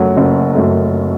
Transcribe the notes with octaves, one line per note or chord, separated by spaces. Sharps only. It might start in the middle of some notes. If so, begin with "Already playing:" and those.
Already playing: F#1 F#2 F#3 A3
F#1
F#2 F#3 A3